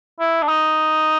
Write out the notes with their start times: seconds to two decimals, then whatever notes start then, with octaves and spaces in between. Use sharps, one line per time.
0.20 E4
0.43 D4
0.48 D#4